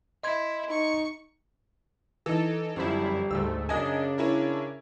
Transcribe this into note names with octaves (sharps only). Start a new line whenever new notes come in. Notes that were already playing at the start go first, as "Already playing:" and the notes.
E4 D#5 C6 G#6
D#4 C#6
E3 D#4 A4
G1 F#2 F3 G3 E4
D2 G#2 A3 E6
F#2 C#3 D4 D#5 G#5
C#4 E4 A#4